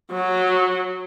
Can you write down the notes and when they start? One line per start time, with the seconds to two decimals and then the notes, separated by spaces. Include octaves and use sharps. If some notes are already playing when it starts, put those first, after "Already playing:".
0.13 F#3